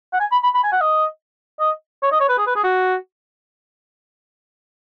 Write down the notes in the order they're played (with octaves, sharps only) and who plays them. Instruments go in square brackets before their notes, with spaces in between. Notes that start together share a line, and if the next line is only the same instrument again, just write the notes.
[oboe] F#5
G#5
B5
B5
B5
G#5
F#5
D#5
D#5
C#5
D#5
C#5
B4
G#4
B4
G#4
F#4